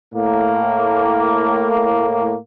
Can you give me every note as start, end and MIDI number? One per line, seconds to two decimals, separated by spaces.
0.15 2.37 45
0.15 2.37 58